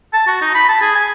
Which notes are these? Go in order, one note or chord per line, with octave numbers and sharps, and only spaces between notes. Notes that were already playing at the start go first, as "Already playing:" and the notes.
A5
F#4
D#4
B5
A5
G#4
G#5